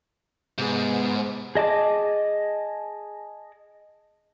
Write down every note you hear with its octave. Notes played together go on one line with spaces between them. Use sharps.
G#2 C3 B3 G#4
G#4 D#5 A5 D6